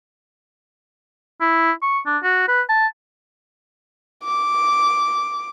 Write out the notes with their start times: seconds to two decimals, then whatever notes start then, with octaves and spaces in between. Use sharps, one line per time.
1.41 E4
1.82 C#6
2.06 D4
2.23 F#4
2.48 B4
2.69 A5
4.24 D6